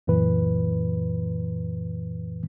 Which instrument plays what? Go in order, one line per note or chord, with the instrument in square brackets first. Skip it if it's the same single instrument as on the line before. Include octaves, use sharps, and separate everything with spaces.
[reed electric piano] C#2 F#2 A#2 E3 B4